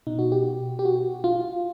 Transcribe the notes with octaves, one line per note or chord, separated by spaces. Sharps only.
B2 D#4
F#4
G4
G4
F#4
F4